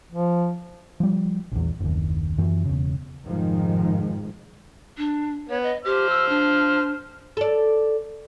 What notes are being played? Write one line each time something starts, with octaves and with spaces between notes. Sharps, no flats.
F3
F3 G3
A#1 E2
F#1 D#2
F#2 E3
E1 C#3
F1 G#2 D#3 F3 G#3
D4
B3 C#5
D#5
G4 C5 F6
E6
D4
A4 D5